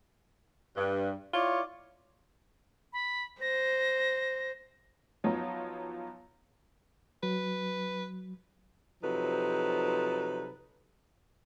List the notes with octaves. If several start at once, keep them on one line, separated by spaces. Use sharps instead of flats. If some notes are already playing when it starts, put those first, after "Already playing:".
G2
E4 F4 C#5 D5
B5
C5 A#6
F3 F#3 B3 D#4 F4 C#5
F#3 B4
C3 F3 F#3 D#4 A4 B4